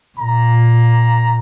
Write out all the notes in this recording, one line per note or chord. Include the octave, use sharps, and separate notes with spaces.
A#2 A#5